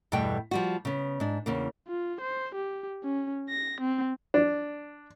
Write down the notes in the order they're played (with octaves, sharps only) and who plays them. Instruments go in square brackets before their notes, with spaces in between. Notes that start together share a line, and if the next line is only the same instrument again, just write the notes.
[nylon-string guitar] E2 G2 B2 G3 A3 G5
F3 G3 F#4
C#3 B3
G#2 D4
E2 C#3 A#3
[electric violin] F4
C5
G4
C#4
A#6
C4
[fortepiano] D4